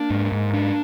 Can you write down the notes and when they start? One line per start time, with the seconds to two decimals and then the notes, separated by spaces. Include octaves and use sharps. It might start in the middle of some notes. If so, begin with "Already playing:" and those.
Already playing: A#3 D4
0.10 G#2
0.32 G#2
0.53 D4